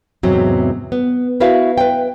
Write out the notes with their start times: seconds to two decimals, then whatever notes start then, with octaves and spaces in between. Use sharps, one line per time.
0.23 E2 G#2 C3 F#3 C4
0.92 B3
1.40 E4 F#4 A#4 B4 E5 F5
1.78 B4 G5